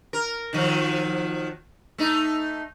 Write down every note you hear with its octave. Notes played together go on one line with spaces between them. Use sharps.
A#4
D#3 F3 F#3
A3 D#4